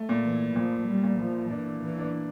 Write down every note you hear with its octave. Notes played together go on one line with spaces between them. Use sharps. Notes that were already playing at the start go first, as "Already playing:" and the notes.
Already playing: A3
A#2
E3
A#2 F3
G3
A#2
F3
E3 D4
E3
D4